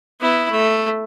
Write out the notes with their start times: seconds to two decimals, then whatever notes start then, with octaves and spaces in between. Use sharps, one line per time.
0.20 B3 E4
0.50 A3